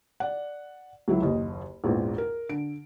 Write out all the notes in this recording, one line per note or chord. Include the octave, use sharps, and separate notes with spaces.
D5 F#5
C#2 F#3 E4
F#1 D#2 D#5
A#1 E2 G#2
A#4
D3 D7